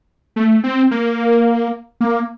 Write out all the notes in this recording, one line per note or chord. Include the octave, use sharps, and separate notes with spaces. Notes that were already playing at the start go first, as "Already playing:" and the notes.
A3
C4
A#3
A#3